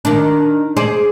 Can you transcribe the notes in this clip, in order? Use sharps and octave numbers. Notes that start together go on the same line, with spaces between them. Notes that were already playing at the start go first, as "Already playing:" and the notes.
D#3 D4
G#4 C5 D5